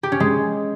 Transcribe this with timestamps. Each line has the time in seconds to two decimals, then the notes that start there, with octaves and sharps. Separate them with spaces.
0.03 G4
0.12 C#4
0.20 G#3